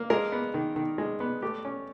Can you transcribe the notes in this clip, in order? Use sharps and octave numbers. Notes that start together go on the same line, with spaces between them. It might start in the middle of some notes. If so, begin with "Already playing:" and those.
Already playing: A#3
G#3 A#4
B3
D#3
D#3
G#3
B3
A3 G4
C#4